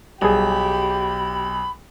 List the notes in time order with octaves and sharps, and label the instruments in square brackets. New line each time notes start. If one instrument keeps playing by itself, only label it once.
[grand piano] B1 [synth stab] G3 G#4 [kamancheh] G4 [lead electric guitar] B5